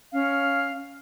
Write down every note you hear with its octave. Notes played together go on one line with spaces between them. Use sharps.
C#4 F5